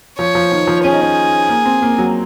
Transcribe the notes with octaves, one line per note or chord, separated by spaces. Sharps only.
F3 C#5
F3
D#3
F3
C#4 G#4
D#4
C#4
A#3
C4
A#3
F#3